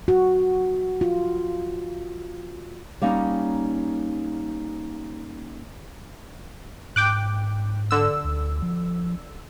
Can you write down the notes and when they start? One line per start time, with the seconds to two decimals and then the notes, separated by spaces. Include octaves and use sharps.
0.08 F#4
1.01 F4
3.02 G3 A#3 C#4 D#4
6.96 G#2 G5 D6 F#6
7.91 D3 E6
8.25 D2
8.62 F3